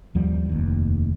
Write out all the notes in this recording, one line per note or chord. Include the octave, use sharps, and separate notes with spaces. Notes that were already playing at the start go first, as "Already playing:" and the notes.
D#2 F3 G3
F1 D#2